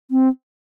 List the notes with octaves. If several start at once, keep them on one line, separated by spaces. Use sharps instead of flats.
C4